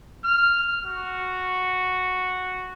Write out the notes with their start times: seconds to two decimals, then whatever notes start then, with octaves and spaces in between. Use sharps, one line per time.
0.25 F6
0.85 F#4